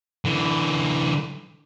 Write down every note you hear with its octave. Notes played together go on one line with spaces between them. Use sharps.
D3 E3